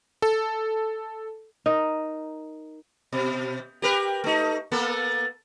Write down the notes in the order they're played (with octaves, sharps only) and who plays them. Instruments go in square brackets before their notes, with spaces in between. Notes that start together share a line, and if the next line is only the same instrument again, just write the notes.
[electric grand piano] A4
[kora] D#4 A#4 D#5
[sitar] B2
G4 A#4 B4
A3 D#4
A#3 B3 A4